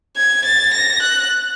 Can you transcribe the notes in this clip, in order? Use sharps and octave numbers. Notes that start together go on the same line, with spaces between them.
G#6
A6
A#6
F#6